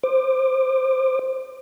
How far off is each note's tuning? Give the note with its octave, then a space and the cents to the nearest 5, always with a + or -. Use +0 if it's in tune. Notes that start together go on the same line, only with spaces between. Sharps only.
C5 +0 D6 +30